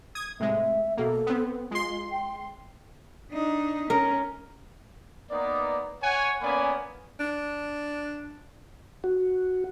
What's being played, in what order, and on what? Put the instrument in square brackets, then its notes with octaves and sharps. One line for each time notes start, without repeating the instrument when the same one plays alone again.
[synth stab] D#6 G#6
[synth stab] A2 C3 G#3 [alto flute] E5
[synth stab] B2 A#3 [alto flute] A4
[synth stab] B3 C4
[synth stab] G#3 C6 [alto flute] F4
[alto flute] G5
[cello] D4 D#4
[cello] C#4 [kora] A#4
[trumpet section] A#3 B3 D#4 D5
C#5 F#5 G#5
A#3 B3 C#4 D5 G#5 B5
[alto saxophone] D4
[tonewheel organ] F#4